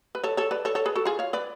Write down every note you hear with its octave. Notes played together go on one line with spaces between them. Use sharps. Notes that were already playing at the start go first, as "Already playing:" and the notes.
B4
A4 C#5
A4 C#5
B4 D5
A4 C#5
A4 C#5
G#4 B4
F#4 A4
F4 G#4
C#5 F5
B4 D5